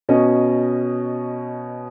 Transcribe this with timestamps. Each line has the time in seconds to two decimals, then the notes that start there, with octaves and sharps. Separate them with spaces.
0.09 B2 C#4 D#5